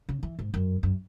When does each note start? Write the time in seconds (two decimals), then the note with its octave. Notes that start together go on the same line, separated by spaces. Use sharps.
0.09 C#3
0.23 E3
0.39 G#2
0.54 F#2
0.83 F#2